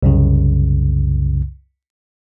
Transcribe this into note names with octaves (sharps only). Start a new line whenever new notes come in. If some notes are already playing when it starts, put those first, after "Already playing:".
C2 F#2 C#3